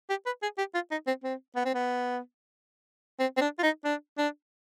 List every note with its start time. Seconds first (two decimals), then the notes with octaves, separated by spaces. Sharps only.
0.10 G4
0.26 B4
0.42 G#4
0.58 G4
0.74 F4
0.91 D#4
1.07 C4
1.24 C4
1.56 B3
1.65 C4
1.74 B3
3.20 C4
3.37 C4
3.41 D4
3.59 F4
3.63 D#4
3.85 D4
4.18 D4